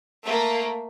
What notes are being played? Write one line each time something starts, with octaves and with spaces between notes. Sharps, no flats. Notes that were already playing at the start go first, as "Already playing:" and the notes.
A3 A#3